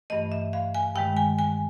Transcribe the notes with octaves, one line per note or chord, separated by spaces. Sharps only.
G2 E3 A3 D#5
E5
F5
G#5
G2 D#3 G#3 G5
G#5
G#5